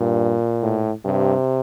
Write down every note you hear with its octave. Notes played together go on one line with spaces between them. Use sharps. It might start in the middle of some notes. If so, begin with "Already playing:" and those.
Already playing: G2 A#2
A2
G2 C3